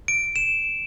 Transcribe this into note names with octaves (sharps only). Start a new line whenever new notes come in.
D7
E7